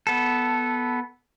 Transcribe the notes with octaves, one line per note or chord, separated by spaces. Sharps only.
B3 A4